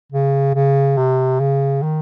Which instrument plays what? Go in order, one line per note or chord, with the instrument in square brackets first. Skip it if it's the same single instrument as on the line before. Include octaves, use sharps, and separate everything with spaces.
[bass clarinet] C#3
C#3
C3
C#3
D#3